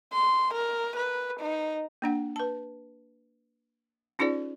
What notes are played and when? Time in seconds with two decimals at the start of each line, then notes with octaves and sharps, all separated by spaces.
0.13 C6
0.54 A#4
0.97 B4
1.40 D#4
2.02 A#3 D4 F#5
2.36 B4 A5
4.19 C#4 D#4 F4 G#4 C5 D5